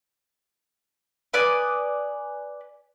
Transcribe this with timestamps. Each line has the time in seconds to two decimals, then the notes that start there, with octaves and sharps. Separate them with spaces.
1.34 B4 D5 G#5 D#6